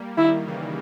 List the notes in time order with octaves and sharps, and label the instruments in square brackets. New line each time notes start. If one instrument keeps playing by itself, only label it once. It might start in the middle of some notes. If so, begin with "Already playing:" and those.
Already playing: [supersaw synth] G3 A#3
[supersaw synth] D#3 [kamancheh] E4
[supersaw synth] C#3 E3